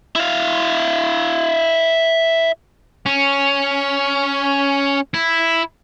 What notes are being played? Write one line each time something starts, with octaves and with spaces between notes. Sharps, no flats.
E4 F5
C#4
E4